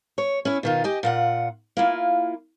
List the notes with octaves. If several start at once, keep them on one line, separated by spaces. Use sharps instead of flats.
C#5
C#4 E4
B2 D#3 F4
G4 D#5 G#5
A#2 F4 F#5
A#3 E4 F4